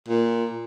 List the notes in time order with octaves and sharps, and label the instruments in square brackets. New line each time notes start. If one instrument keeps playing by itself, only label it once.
[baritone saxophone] A#2